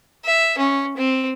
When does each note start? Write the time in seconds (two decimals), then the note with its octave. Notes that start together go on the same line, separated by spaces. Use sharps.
0.25 E5
0.58 C#4
0.97 C4